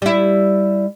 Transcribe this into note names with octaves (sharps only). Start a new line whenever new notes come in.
G3 E4